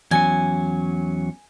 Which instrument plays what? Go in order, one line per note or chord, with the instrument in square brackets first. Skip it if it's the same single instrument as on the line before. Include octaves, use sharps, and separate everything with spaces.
[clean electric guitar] E2 F#3 C#4 [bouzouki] G#5